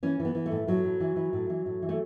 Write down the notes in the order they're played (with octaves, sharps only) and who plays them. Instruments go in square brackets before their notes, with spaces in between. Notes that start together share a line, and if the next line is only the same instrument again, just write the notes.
[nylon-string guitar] E3 C#4
E3
B3
E3
A3
A2
A2 F#3
A2
E3
E3
A2
E3
A2
E3
A3